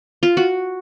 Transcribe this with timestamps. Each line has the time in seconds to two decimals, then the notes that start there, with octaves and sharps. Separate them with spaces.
0.23 F4
0.37 F#4